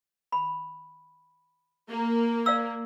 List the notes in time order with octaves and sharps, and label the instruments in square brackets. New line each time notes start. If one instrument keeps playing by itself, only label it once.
[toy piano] B5
[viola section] A#3
[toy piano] D5 F5 E6